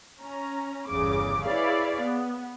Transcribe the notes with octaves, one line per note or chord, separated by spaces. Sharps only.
C#4 A#5
G1 E2 C#3 D6
E4 G#4 B4 C#5 D5 F5
B3